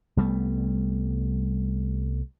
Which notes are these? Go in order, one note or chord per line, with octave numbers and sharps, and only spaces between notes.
C2 G3 A3 B3